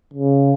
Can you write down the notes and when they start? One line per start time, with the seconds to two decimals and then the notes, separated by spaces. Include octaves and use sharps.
0.13 C#3